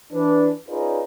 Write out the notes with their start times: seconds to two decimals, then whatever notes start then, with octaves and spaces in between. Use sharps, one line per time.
0.12 E3 D4 B4
0.68 C#4 D#4 F4 G#4 B4 D5